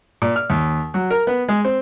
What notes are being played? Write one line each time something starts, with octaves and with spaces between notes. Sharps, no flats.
A#2
F6
D#2
F#3
A#4
B3
G#3
C4